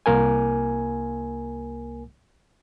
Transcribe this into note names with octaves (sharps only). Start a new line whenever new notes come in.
C2 A#3 A#4 G#5